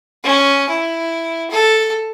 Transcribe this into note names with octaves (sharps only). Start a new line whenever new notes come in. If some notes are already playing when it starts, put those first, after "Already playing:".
C#4
E4
A4